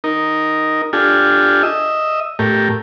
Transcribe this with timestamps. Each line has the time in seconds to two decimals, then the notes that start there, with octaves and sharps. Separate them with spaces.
0.04 D#4 A#4
0.93 D4 F4 G4 A4 G#5
1.63 D#5 E5
2.39 A2 A3 G4 A#4